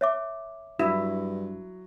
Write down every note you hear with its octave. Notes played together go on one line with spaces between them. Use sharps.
C#5 E5 D6
G2 F#3 E4